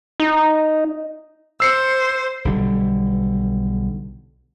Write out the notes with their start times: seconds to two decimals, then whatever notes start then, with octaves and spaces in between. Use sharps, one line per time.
0.20 D#4
1.60 C5 E6 C7 C#7
2.45 B1 D3 G3